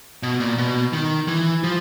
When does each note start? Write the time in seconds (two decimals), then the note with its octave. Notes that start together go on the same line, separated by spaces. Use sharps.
0.23 B2
0.40 A#2
0.58 B2
0.93 D#3
1.28 E3
1.64 F3